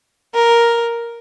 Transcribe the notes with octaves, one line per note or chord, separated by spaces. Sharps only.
A#4